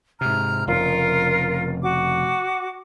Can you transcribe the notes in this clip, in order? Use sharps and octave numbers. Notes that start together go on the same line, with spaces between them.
G#2 C3 A#5 F6
F1 C#3 F4 A#4
F#4 D6